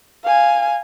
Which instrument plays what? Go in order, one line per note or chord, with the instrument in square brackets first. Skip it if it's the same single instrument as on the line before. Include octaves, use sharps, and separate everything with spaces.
[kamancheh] F5 G#5